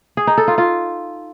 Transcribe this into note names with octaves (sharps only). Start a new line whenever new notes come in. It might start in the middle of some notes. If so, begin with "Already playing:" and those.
G#4
D#4
A4
F4
F4